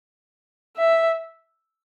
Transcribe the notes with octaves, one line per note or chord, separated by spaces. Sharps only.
E5